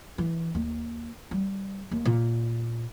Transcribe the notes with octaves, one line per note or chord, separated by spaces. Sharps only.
E3
D#2
G3
D#2
A#2